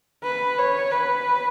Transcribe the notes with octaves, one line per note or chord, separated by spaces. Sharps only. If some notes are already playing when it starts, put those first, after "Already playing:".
B4
C#5
B4